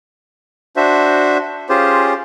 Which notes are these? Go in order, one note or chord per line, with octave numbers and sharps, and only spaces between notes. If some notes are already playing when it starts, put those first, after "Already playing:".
D4 F#4 C5 E5
C#4 F4 G4 G#4 C5